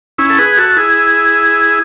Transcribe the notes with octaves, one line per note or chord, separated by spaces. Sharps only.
C#4 E4
A4
G#4 B4
F#4 A4
E4 G#4